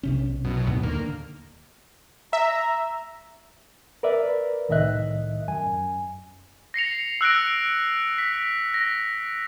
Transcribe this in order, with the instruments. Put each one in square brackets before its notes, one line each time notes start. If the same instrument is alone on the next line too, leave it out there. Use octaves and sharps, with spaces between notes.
[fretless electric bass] B1 C3 C#4
[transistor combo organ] F#2 B2
[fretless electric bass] D2 A2
[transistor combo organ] D#2 A#3 [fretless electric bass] D3
[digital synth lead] E5 [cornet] A#5
[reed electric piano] A#4 B4 D5 E5
C2 A2 D#3 D#5 E5 F#6
F#2 G#5
[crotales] A#6 C7 C#7 F7
E6 F#6 A#6 D7
B6
A#6